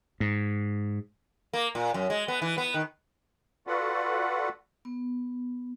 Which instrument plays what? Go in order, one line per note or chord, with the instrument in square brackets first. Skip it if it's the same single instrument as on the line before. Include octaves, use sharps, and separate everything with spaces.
[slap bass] G#2
[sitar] A#3
A#2
F#2
G#3
B3
E3
B3
D#3
[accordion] F4 F#4 A4 B4 D5 F#5
[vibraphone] B3